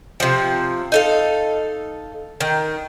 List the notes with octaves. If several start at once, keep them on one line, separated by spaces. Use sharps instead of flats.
C3 F3
D#4 A4 F5
D#3